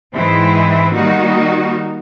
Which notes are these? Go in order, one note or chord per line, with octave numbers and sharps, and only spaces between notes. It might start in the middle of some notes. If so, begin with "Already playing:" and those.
G#2 E3 G#3 C4 E4
D#3 G3 A#3 D#4 F#4